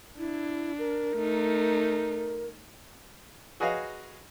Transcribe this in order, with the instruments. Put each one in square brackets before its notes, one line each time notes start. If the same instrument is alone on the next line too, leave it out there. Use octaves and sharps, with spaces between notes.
[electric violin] D4 [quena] E4
[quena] A#4
[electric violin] A3 D#4
[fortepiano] F#4 G#4 B4 C#5 D#5 F5